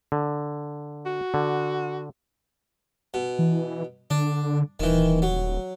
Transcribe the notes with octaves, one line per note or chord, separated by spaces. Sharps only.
D3
F#4
D3
B2
E3
D3 D4
D#1 D#3 E3
F#3